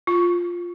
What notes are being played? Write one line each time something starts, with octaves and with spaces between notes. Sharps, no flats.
F4